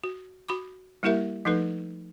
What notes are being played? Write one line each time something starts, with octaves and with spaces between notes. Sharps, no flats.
F#4
F#4 B5 D6
G3 A#3 E4 G4 A#4 E5
F3 A3 D#4 A4 B4